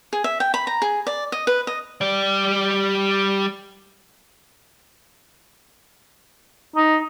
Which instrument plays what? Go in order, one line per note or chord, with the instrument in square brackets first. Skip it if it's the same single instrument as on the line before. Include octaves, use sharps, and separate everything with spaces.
[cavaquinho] G#4
E5
G5
B5
A#5
G#4
D5
D#5
B4
D#5
[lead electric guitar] G3 D5
[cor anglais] D#4